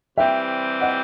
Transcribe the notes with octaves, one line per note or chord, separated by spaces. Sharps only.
C3 E3 G3 C4 E5 G5
D#5 F#5